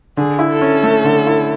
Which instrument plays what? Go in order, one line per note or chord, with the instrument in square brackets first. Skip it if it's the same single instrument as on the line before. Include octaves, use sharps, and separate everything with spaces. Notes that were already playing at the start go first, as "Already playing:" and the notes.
[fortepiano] D3 [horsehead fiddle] G#4
[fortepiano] E4
[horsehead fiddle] A4
[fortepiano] C#4
A3
D3
E4